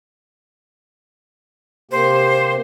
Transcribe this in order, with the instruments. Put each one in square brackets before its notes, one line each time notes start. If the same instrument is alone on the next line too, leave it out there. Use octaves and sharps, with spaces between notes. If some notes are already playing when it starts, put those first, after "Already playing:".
[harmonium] C3 A#3 G4 [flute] C5